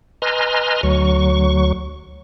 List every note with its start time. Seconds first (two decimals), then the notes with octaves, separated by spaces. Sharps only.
0.22 B4 D#5 G#5 A#5 C6 F6
0.83 D2 F#3 C#6